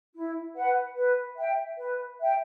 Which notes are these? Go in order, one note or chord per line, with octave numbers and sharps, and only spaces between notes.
E4
B4 F#5
B4
E5 G5
B4
E5 G5